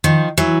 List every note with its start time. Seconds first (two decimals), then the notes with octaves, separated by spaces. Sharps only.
0.04 D#3 F3
0.38 E3 F#3